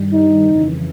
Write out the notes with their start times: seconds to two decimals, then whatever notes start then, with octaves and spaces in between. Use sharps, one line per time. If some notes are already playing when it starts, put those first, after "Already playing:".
Already playing: G2 D#3 G3
0.13 D#4
0.43 F2 C#3 E3